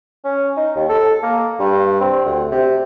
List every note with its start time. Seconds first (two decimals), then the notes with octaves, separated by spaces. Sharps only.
0.24 C#4
0.57 D#4
0.76 D#2
0.89 A4
1.23 A#3
1.59 G2
2.00 C4
2.26 D2
2.51 C3